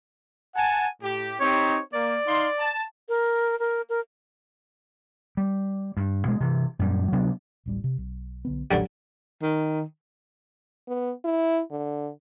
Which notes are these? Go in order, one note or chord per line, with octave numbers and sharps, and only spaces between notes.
F#5 G#5 A5
A2 G4
C4 D#4 G4 C#5
A#3 D5
D#4 F5 C6
A5
A#4
A#4
A#4
G3
G2
B2 G#3
C3 E3
F#2 A#2 G3
C3 F#3 B3 D4
D1 A1 G3
C3
B1
B1 D3 B3
A1 D3 F#3 G3
D#3
B3
E4
D3